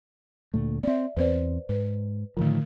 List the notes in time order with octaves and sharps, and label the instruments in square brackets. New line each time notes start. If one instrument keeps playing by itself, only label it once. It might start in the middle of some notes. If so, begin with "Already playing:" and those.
[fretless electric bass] D2 A#2 A3
[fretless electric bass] B3 C4 [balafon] D5 E5
[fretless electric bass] E2 C4 [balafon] B4 C5 D5
[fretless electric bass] G#2 [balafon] B4
[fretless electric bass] A2 D#3 F3 [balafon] D3 A3